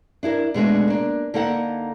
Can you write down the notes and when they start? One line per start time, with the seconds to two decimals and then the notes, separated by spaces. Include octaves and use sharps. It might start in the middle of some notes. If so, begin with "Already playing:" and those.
0.23 D4 E4 G#4 A#4
0.54 B2 G#3 A3 D4
0.88 A#3 D4
1.34 D3 A#3 D#4 A4 F#5